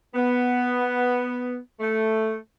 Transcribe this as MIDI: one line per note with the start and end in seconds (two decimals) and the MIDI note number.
0.15 1.56 59
1.79 2.35 57